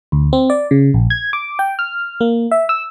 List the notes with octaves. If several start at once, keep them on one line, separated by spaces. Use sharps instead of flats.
D2
C4
D5
C#3
A#1
G#6
D6
G5
F6
A#3
E5
E6